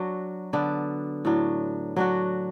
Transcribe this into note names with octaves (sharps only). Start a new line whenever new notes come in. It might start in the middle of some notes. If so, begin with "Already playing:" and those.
Already playing: F#3 D4 F#4
D3 B3 D4
A2 F#3 D4
F#3 D4 F#4